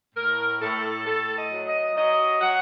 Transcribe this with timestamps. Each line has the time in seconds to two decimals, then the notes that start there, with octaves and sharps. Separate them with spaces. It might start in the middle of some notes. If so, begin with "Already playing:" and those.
0.15 A2 A#4
0.61 A2 A4
1.06 A2 A4
1.36 D#5
1.51 F#3
1.66 D#5
1.96 F#3 D#5
2.41 F#3 F#5